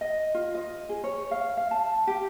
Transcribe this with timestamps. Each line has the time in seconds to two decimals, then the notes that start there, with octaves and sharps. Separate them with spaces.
0.01 D#5
0.34 F4
0.54 D#5
0.89 G#4
1.04 C#5
1.31 F5
1.57 F5
1.71 A5
2.07 G4